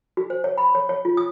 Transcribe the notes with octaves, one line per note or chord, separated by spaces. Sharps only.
F#4
C5
C#5
B5
C#5
C#5
F4
D#6